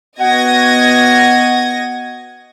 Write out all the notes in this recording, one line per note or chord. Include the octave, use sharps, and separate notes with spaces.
B3 F#4 D#5 F#5 G#6 A#6